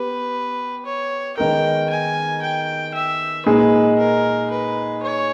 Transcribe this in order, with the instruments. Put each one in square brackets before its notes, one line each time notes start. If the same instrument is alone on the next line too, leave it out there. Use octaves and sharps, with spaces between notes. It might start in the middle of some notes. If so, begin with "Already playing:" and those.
Already playing: [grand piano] B3 G4 [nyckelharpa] B4
[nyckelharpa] C#5
[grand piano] D#3 G#3 B3 D#4 A#4 [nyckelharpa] G5
[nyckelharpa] G#5
G5
E5
[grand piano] A#2 G#3 D#4 G#4 [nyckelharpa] B4
[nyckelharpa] A#4
B4
C#5